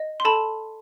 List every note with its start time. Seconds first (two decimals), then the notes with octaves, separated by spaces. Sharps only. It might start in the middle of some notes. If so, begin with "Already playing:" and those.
Already playing: D#5
0.20 C6
0.25 A4 A5 B5